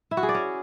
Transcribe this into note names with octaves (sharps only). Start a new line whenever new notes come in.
E4
F#4
G#4
D5
C#4